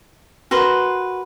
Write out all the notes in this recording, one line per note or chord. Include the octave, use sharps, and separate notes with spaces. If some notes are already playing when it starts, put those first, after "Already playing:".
F#4 A#4 B4 C6